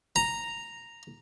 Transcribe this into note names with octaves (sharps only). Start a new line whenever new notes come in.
A#5